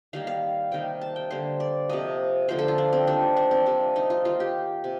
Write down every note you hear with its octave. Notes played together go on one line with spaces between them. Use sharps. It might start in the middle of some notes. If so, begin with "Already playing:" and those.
D#3 G3 A#3 F5
F5
C3 D#3 A#3 G5
A5
G5
D3 G3 A#3 C5
D5
C3 F3 A#3 D#5
D3 F3 A#3 C5
A4
F4
D4
C4
D#3 G3 A#3 D4
D4
C4
C3 G3 A#3 D4
D#4
F4
D#3 A#3 F4
G4
C3